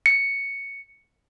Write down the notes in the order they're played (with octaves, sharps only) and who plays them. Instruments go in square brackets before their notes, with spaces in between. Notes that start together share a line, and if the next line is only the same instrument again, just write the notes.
[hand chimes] C#7